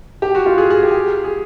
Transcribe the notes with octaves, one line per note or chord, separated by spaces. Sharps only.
G4
F#4
F4
G#4
G#4
G4
G#4